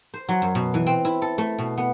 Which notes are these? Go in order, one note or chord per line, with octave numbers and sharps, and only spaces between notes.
C5
F#3
F#2
B2
E3
C4
E4
A4
A3
B2
B3